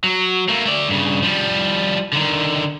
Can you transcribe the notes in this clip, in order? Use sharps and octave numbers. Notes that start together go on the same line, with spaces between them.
F#3
A3 A#3
A3 D5
G2 C#3
F3 G3
D3 D#3